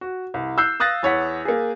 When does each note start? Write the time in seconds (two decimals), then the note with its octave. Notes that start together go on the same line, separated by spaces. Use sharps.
0.01 F#4
0.34 C2
0.58 E6 F#6 G6 C7
0.80 F5 D#6 F#6 A6 A#6
1.03 E2 C#5 F#5 B6
1.45 A#3 G#4